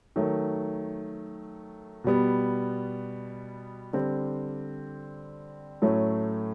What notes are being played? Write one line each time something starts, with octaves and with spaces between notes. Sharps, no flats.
D#3 F#3 A3
B2 G3 B3
D3 G3 C4
A2 F#3 A3 C#4